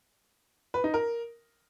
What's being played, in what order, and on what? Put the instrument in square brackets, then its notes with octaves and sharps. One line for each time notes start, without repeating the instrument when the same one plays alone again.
[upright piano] B4
D#4
A#4